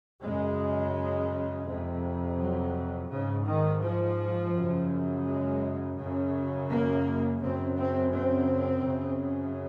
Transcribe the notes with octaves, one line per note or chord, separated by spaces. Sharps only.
F#2 C#3 G#3
F2 C3
F#3
G#2 C#3
D#3
F3
F#2 C#3
G#3
F#2 C#3
A#3
F#2 C#3 C4
C4
C4
F#2 C#3